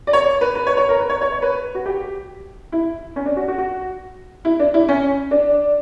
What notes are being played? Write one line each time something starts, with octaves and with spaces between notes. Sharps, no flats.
D5
C#5
B4
B4
C#5
C#5
A#4
B4
C#5
C#5
C#5
B4
F#4
G4
E4
C#4
D4
F#4
F#4
F#4
E4
D4
E4
C#4
D4